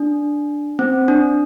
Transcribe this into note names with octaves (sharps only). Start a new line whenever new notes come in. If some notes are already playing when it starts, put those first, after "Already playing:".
Already playing: D4
C4
D4